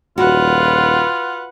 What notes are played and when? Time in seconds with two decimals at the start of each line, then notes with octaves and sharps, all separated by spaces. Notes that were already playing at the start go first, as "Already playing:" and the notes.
0.18 D#1 F4 F#4 B4 F#5